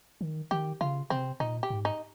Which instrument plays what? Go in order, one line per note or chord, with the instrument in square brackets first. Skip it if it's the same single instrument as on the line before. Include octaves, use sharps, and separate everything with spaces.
[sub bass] D#3
[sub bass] D#3 [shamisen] G4
[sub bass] C#3 [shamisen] F4
[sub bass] C3 [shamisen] C4
[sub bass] A#2 [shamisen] D#4
[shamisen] G4
[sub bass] G#2
[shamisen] D#4